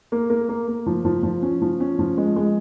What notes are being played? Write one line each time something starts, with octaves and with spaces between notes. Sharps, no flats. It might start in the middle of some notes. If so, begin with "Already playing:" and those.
A#3
A#3
A#3
A#3
F3
F3
F3
C#4
F3
C#4
F3
G#3
G#3